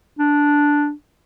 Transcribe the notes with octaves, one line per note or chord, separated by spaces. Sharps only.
D4